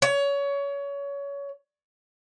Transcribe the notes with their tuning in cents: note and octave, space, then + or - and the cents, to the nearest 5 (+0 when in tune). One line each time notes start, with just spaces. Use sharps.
C#5 +25